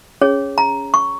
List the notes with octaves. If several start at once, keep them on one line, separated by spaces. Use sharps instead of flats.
C#4 G#4 C#5
A#5
C#6